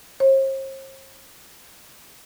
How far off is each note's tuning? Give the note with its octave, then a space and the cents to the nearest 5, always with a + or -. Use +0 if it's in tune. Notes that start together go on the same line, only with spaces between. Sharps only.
C5 +45